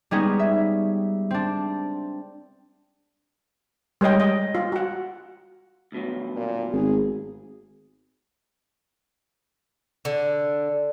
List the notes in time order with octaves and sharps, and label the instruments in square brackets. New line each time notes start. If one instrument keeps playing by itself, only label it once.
[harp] G3 G#3 B3 C#4 D#4 G#4
E5
C4 D4
[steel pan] G3 G#3 C#5 D#5 G5
D#5
F4
F#4 F#5
[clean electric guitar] D2 B2 F#3
[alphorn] A#2
[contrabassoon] G#1 [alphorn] G#4
[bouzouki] D3